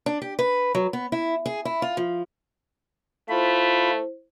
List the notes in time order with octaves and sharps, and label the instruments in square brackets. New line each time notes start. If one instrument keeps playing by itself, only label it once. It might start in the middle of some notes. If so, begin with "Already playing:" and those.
[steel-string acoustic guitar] D4
G4
B4
F#3
B3
E4
G#4
E4
F4
F3
[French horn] A3 [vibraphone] E4 C5 [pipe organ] F4 B5